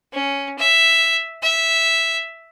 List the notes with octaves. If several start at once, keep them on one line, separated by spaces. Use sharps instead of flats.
C#4
E5
E5